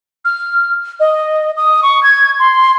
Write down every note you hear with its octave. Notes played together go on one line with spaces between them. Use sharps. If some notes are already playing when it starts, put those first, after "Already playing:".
F6
D#5
D#6
C#6
G#6
C6